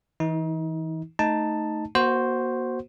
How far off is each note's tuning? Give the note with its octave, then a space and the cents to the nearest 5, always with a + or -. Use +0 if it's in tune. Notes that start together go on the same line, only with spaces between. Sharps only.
E3 -25 D#4 +35
A3 +0 D#4 +0 A5 +5
A#3 +40 F#4 +0 C5 +0